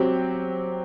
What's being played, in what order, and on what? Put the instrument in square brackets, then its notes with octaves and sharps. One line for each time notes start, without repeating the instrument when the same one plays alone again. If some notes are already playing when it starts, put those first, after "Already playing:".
Already playing: [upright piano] F#3 C4 G4